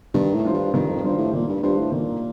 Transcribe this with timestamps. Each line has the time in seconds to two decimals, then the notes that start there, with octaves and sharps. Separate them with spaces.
0.14 G2 D#3
0.34 A2
0.44 G3 D4 F4 C5
0.54 G2
0.74 G2 D#3
0.89 F2
1.04 G2 G3 D4 F4 C5
1.18 A2
1.33 A#2 D#3
1.49 G2
1.63 G2 G3 D4 F4 C5
1.77 A2
1.92 A#2 D#3